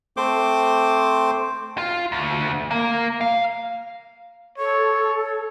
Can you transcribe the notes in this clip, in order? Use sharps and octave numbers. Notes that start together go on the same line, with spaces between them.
A3 C4 C5 C6 D6
F4
D2
A#3
F5
A4 C#5